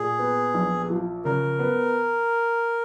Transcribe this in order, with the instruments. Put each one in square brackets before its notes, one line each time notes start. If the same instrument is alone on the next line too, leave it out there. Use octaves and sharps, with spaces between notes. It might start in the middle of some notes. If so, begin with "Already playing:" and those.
Already playing: [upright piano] A#2 [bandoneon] G#4
[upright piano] B3
A#1
F3
[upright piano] C#3 [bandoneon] A#4
[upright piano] B3